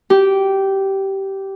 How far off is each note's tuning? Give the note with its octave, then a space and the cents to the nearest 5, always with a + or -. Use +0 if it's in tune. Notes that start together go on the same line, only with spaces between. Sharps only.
G4 -15